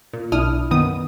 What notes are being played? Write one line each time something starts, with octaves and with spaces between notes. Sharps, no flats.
A#2
B1 D4 E4 D#6 F6
F#2 D#3 B3 D#6